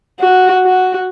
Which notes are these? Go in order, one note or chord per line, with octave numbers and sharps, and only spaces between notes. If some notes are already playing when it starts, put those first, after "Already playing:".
F#4
F#4